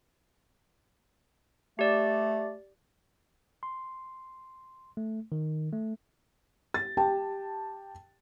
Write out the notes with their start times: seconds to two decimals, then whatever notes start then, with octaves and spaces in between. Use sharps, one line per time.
1.79 A3 G4 D5
3.63 C6
4.97 A3
5.32 D#3
5.73 A3
6.74 A6
6.97 G4 G5 A5